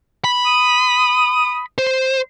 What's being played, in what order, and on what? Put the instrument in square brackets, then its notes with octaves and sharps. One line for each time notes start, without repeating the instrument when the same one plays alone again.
[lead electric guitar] B5
[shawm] D#6
[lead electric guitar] C5